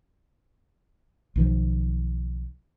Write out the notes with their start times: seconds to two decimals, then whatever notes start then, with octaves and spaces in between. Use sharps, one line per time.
1.36 B1 D#3 F3